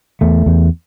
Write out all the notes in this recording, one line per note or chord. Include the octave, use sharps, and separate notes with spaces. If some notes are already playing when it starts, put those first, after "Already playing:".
E2 A3
E2